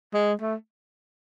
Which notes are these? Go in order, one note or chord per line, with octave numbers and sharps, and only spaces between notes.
G#3
A3